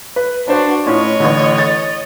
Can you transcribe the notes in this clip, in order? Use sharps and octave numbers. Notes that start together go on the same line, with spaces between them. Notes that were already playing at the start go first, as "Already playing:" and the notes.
B4
D4 F#4 B4 C5 F#5
A2 C#4 F4 C#5 D#5
A1 A2 D3
A6